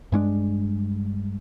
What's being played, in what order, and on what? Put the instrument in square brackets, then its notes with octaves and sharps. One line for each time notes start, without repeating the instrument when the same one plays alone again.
[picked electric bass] G2 G#3 C#4 D4